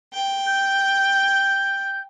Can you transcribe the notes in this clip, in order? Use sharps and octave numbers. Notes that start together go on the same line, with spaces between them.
G5
G6